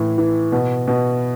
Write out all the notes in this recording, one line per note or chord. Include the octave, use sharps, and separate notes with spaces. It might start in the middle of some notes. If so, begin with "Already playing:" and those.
Already playing: A2 E3
E3
B2
B2